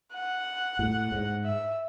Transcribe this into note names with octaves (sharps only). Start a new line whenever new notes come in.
F#5
A2
G#2
E5